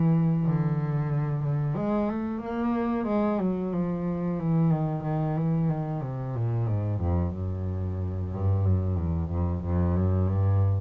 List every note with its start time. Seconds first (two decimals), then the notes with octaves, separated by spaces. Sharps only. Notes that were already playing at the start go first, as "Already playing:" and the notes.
Already playing: E3
0.45 D3
1.43 D3
1.76 G#3
2.09 A3
2.41 A#3
3.07 G#3
3.40 F#3
3.73 F3
4.39 E3
4.71 D#3
5.04 D#3
5.37 E3
5.69 D#3
6.02 C3
6.35 A#2
6.68 G#2
7.01 F2
7.34 F#2
8.32 G2
8.65 F#2
8.98 E2
9.31 F2
9.64 F2
9.96 F#2
10.29 G2